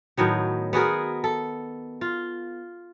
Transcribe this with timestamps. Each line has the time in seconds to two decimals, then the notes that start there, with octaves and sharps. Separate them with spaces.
0.17 A2 D#3 F#3 B3
0.73 B3 F#4 G#4 A#4
1.24 A4
2.01 F4